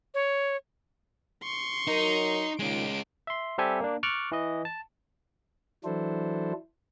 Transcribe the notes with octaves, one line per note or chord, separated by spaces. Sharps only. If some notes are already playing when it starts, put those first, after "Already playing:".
C#5
C6 C#6
F#3 D#4 A#4
A#2 D#3 G#3 C#4 D7
E5 C6
G3 C4 G4 A4 E5 G#5
A#3 D4
C#6 D6 F6 F#6 A6
E3 D#5
A5
E3 F#3 D4 E4 A4 C5